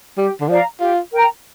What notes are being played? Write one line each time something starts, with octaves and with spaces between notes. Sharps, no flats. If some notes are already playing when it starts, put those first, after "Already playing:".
G3 G4
D3
F3 D5 F5 A#5
F4 G4
A#4 G5 A#5